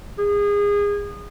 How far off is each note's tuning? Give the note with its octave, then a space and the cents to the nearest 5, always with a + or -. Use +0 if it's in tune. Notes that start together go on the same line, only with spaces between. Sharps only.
G#4 -25